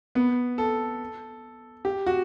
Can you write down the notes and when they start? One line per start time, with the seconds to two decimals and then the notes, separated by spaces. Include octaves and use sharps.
0.15 B3
0.58 A4
1.85 G4
2.06 F#4